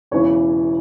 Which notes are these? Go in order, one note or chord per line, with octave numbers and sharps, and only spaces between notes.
E1 E2 C#3 E3 C#5